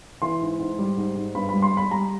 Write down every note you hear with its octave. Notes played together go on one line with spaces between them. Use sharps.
E3 C6
G#2
G#2
G3
G#2
G#2
G2 B5
G3 B5
C6
G3
B5
G3 A#5